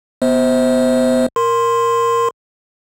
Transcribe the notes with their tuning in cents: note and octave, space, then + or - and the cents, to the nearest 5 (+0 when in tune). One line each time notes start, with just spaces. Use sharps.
B3 +0 C5 -5 E5 -35
A#4 +0 C6 +0